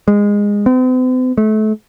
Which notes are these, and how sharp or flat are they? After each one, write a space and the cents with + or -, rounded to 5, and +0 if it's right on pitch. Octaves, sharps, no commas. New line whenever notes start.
G#3 -20
C4 -45
A3 -30